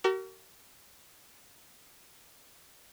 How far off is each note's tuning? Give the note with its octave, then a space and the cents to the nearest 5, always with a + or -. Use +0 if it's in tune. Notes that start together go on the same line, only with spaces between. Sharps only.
F#4 +45 A#4 -20